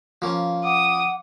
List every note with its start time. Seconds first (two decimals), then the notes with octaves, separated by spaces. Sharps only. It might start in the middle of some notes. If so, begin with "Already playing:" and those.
0.22 F3 A#3 C#4
0.64 F#5 D6 D#6